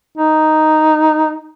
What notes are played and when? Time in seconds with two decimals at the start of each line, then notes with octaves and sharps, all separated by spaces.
0.18 D#4